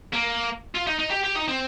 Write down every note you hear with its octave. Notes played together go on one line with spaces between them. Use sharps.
A#3
F4
D#4
D#4
G4
G4
D#4
C4